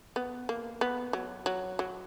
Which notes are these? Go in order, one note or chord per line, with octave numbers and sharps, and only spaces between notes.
B3
A#3
B3
F#3
F#3
F#3